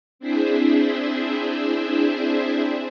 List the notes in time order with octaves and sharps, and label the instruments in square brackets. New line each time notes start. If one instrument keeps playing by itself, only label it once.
[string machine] C4 D4 E4 G#4 C5 E5